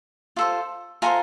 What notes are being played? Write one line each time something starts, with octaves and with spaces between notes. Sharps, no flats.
F4 A4 C5
F4 A4 C5 G#5 A#5